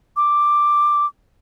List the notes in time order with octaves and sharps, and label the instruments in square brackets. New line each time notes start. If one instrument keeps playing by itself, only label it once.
[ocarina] D6